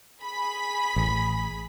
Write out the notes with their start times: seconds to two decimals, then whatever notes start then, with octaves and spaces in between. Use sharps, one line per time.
0.21 G#4 B5 B6
0.96 A1